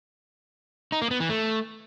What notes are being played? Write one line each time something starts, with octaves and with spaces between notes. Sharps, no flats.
D#4
A#3
B3
E3
A3